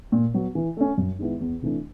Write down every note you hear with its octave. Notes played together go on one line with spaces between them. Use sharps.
A#2
F#3 B3
E3
A3 C#4
F#2
D#3 G#3 B3 E4
E2
C3 E3 A3 D4